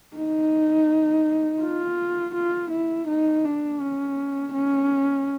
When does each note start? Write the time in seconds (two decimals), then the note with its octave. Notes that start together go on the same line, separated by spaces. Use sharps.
0.16 D#4
1.62 F4
2.34 F4
2.71 E4
3.07 D#4
3.45 D4
3.80 C#4
4.54 C#4